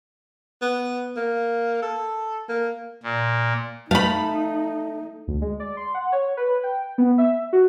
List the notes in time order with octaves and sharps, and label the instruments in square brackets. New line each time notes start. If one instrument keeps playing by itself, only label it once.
[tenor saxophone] B3
A#3
A4
A#3
[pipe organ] A#2
[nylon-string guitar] A3 [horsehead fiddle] D#4 [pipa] F5 B5
[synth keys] D2
G#3
D5
C6
F#5
C#5
B4
G5
B3
E5
F#4